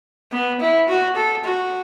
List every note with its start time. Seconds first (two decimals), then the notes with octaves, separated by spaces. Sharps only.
0.32 B3
0.60 E4
0.88 F#4
1.16 A4
1.44 F#4